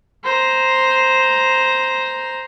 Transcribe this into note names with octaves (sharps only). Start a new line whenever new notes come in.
C5 A#5